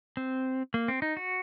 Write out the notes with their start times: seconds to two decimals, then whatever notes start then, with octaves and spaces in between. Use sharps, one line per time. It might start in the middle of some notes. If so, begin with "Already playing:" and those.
0.17 C4
0.74 A#3
0.88 C4
1.02 D#4
1.17 F#4